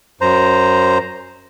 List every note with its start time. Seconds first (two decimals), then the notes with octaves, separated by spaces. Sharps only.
0.21 F#2 C5 A#5